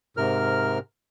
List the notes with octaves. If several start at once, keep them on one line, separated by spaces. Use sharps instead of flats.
G#2 C3 A#4 F6